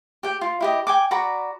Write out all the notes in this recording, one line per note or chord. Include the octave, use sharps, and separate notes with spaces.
G4 G5
F4
E4 G4 D#5
G5 G#5 D6
F#4 D5 A#5 B5